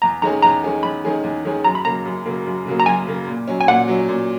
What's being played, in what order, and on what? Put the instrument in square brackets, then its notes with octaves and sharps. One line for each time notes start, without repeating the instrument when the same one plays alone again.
[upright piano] E2 [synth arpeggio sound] A#5
[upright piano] D#3 G#3 C#4 G#4 [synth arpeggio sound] A#5
[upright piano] E2 [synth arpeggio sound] A#5
[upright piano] D#3 G#3 C#4 G#4
[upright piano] E2 [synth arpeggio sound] B5
[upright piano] D#3 G#3 C#4 G#4
E2
D#3 G#3 C#4 G#4
[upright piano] F#2 [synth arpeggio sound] A#5
[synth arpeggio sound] B5
[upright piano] C#3 F#3 A#3 [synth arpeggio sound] A#5
[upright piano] F#2
C#3 F#3 A#3
F#2
C#3 F#3 A#3
[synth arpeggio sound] A#5
[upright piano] F#2 [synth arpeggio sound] G#5
[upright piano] C#3 F#3 A#3
A#2
F#3 C#4
[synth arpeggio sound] G#5
[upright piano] A#2 [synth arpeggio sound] F#5
[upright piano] F#3 C#4
A#2